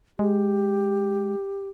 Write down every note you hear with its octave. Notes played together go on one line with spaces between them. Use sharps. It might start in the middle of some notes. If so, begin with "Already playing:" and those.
G#3 G4